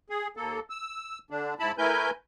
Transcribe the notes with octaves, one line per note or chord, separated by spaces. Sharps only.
G#4
D#2 A#3 A4
E6
D3 D4
G#2 E4 A5 B5
A3 E4 A#4 B4 G#5 G6